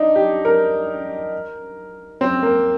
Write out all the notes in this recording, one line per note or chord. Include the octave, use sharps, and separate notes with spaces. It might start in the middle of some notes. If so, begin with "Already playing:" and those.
Already playing: D4 D#4
G4
A#4
C4
A#3